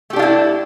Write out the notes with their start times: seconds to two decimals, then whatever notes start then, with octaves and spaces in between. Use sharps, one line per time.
0.10 A3
0.13 G4
0.16 D4
0.19 F4
0.22 E4